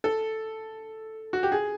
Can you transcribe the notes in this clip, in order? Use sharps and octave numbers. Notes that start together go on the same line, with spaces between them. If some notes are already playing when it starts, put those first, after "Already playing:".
A4
F#4
G4
G#4